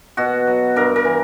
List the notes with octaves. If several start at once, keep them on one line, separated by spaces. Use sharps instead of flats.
B2 F#4
F#3
G2 A#4
A#4
E3